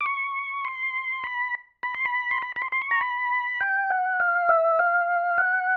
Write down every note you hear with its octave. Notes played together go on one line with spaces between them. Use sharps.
D6
C#6
C6
B5
B5
C6
B5
C6
B5
B5
C6
C6
C#6
A#5
B5
G5
F#5
F5
E5
F5
F#5